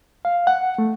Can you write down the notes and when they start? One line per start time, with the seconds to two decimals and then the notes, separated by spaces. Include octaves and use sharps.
0.25 F5
0.47 F#5
0.78 A3